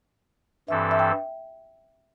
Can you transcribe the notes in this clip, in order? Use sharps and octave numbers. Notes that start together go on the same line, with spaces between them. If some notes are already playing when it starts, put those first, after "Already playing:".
G2 E3 C4 A4 E5
E5
G5